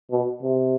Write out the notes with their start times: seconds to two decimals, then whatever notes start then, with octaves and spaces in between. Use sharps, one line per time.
0.11 B2
0.43 C3